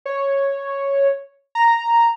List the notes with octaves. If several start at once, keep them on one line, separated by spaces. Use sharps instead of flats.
C#5
A#5